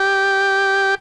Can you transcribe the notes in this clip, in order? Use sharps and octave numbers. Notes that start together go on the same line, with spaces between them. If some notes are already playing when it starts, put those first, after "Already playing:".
Already playing: G4